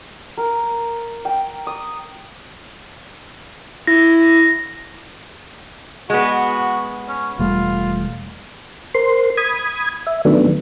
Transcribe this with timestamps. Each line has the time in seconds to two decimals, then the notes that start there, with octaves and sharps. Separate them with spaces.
0.37 A#4
1.25 G5
1.67 D#6
3.87 E4 A#6
6.10 G#3 B3 F#4
7.08 C#4
7.39 E1 G3 A3 F4
8.95 A#4 C5 C6
9.37 B5 D#6 G#6
10.07 E5
10.25 D#3 F#3 A3 B3 D4